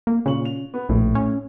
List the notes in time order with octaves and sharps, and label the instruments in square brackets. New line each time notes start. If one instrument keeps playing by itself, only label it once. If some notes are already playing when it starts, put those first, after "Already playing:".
[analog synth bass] A#3
[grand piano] A#2 C#6 F#7 [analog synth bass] C#3
[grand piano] F7
B3
[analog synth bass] A#1 [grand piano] A2
[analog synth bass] C#4